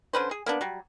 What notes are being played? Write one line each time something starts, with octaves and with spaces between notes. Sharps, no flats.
D3 C#4 B4 C5
G#4
A#3 B3 D4
F#3 G3